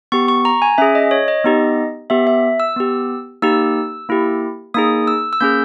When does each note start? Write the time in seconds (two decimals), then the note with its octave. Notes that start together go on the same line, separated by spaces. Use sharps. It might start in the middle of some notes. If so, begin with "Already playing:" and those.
0.12 B3 G4 C#6
0.28 C#6
0.45 A#5
0.62 G#5
0.78 C#4 G#4 E5
0.95 D#5
1.11 C#5
1.28 D#5
1.44 B3 D#4 G4
2.10 B3 G4 E5
2.27 E5
2.60 E6
2.76 B3 G4
3.42 A#3 D#4 G4 E6
4.09 A#3 E4 G4
4.74 A#3 D#4 G#4 D#6
5.07 E6
5.33 E6
5.41 A#3 C#4 G#4 G6